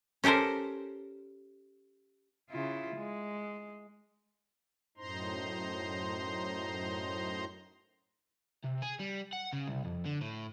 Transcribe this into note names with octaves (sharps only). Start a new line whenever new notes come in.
C#4 G4 A4 A#4 C5
C#3 E4 F4
G#3
F#2 A2 D#4 C5 A#5 C6
C3
G#4
G3
F#5
C#3
C2
F2
D3
A2